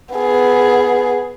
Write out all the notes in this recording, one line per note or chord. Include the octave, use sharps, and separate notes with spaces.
B3 G#4